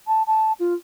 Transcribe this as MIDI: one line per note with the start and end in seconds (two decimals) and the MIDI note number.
0.07 0.22 81
0.26 0.52 81
0.59 0.73 65